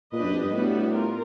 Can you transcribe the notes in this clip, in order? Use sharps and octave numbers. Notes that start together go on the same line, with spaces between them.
A#2 D4 G4 B4 D#5
F#2
F2
G2
A2 G3 B3 D4 F#4 B4
F4 A#4